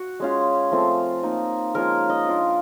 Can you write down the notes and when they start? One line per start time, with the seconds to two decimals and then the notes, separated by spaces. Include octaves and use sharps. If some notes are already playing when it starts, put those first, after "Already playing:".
Already playing: F#4
0.20 G#3 C#4 F4
0.71 F3 A3 C4 F4
1.23 A#3 D#4
1.75 F3 G#3 C#4 F4 A#4
2.10 D#5
2.26 A#3 D4 F4